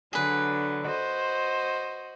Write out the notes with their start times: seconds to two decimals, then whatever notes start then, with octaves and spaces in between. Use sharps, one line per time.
0.13 D3 F#3 D4 G#4 B4
0.86 F#4 C5 D#5